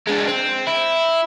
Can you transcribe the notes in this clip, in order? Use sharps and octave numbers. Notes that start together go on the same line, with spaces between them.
G#3 D4
C4
E4